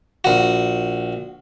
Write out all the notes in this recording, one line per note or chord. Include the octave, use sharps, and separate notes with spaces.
A#1 F#4